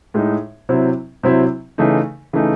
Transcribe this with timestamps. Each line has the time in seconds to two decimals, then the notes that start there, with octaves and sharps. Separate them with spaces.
0.14 A2 G#3 D#4
0.69 C3 F#3 C4 E4
1.23 C3 F#3 C4 E4
1.78 C#3 E3 A3 D#4
2.33 C#3 E3 A3 D#4